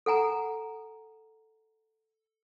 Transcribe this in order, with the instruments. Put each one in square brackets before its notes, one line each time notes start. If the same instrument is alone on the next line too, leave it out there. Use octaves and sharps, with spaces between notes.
[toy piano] A4 F#5 G#5 A#5